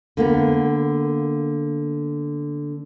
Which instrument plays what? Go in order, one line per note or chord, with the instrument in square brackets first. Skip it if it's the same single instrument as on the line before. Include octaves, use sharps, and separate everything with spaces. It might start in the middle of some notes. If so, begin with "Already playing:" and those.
[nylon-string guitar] D3 A#3 B3